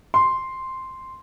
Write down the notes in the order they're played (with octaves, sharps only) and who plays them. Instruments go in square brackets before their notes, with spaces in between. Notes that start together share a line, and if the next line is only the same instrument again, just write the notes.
[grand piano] C6